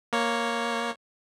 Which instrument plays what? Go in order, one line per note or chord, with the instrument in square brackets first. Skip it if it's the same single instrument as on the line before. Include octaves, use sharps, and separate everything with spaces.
[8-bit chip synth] A#3 C#5